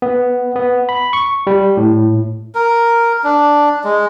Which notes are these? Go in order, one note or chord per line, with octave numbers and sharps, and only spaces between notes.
B3
B3
B5
C#6
G3
A2
A#4
D4
G#3